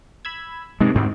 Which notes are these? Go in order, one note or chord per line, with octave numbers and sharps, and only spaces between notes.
B5 E6 G#6
G2 C3 D#3 G#3
D2 G#2 C4